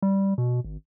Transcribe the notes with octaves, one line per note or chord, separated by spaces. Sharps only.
G3
B2
G#1